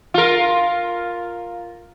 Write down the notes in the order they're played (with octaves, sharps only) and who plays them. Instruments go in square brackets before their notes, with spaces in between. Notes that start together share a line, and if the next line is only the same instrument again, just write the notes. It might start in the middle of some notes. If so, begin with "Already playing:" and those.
[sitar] F4 A#4